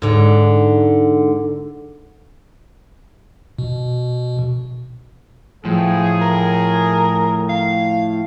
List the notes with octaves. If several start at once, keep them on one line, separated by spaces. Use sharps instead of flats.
G#2 D3
B2
A2 F3 G#4
A#4
F5